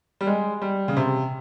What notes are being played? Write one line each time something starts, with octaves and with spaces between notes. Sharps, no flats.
G3
G#3
G3
C#3
C3